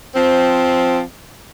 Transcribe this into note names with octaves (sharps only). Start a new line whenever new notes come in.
F3 C4